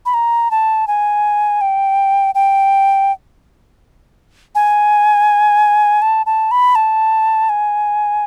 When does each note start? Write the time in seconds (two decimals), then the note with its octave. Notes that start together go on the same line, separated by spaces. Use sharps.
0.05 B5
0.14 A#5
0.51 A5
0.87 G#5
1.61 G5
2.35 G5
4.55 G#5
6.02 A5
6.26 A5
6.51 B5
6.75 A5
7.49 G#5